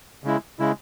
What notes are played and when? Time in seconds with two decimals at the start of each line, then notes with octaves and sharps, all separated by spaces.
0.24 C#3 G#3 E4
0.59 C#3 G#3 E4